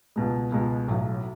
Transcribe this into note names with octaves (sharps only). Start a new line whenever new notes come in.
C#2 B2 G#3
C#2 B2 G#3
B1 A2 F#3